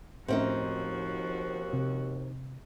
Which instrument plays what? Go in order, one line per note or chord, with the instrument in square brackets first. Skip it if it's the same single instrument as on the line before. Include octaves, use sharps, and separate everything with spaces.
[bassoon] D#2 [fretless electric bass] A2 [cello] F3 F#4 [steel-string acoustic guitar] C4 C#4 D#4
[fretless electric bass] C3